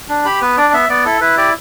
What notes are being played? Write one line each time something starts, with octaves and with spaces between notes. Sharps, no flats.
D4
G4 B5
B3 B4
D4 D5
B3 E5
B3 D5
E4 A4
E4 B4
G4 D5